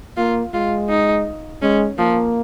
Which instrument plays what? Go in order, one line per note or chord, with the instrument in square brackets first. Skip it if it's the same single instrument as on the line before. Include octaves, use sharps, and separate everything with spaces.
[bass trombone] A#3 [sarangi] F4
[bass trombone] G#3 [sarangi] F4
[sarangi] D#4
[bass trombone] G#3 [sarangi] C#4
[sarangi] F3 [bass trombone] A#3